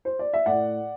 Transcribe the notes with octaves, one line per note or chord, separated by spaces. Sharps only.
C5
D5
E5
A2 D5 F#5